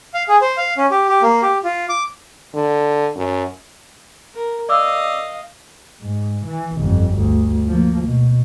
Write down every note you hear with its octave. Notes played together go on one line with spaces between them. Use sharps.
F5
G#4
C5
F5
C#4
G4
G4
A#3
G4
F4
D6
D3
F#2
A#4
D5 D#5 F5 D6 E6
G#2
E3
G1 F2
D2
F3 A#3
B2